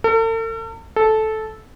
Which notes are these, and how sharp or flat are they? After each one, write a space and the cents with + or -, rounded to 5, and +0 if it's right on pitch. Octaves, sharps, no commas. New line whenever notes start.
A4 +45
A4 -10